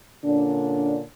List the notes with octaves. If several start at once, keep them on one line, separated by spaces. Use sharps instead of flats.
A#2 D3 C#4 D4